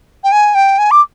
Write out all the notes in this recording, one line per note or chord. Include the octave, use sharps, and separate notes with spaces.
G5
G#5
G5
G#5
D6